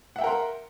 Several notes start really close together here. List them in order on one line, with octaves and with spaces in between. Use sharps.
F#5 E5 G5 A#4 C6